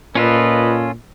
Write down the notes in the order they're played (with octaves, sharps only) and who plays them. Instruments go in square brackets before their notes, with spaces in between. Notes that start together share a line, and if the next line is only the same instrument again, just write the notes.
[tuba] A#2 [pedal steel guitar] C#4 F4 A4 [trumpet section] B4 D#5